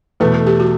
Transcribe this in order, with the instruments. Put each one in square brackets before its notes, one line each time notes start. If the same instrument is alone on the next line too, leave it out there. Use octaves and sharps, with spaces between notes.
[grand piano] E2 B2 A3 [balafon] B4
[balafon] A4
G4
F#4